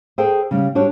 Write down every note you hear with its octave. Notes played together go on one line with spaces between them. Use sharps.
G#4 A4 C5 G5
C#3 G3
G3 D4 F#4 C#5